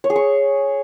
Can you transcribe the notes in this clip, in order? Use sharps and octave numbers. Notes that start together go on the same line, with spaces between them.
C#5
G#4
C#6